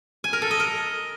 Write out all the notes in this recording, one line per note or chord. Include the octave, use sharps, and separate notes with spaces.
G#5
A#4
A4
D#5
A#4